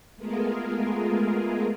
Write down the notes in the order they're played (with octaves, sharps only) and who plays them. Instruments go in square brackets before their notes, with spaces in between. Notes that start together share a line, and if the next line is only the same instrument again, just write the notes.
[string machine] G#3 A3 B3 F4 G#4 A#4